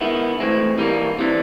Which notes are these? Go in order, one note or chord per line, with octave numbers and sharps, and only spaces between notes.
D#3 G#3 B3 E4
A2 E3 G#3 C4
E3 G3 A#3 D#4
C3 E3 G3